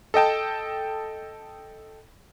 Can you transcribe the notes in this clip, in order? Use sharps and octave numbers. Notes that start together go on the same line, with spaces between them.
A4 D#5 G5 A5